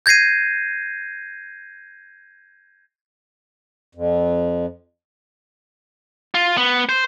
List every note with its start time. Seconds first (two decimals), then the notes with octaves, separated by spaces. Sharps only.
0.06 G6 G#6 A#6 C7 D#7
3.95 F2
6.35 F4
6.57 B3
6.89 C5